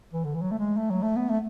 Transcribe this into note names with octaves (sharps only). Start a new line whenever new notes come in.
E3
D3
E3
F#3
A3
G#3
A3
F#3
A3
B3
A3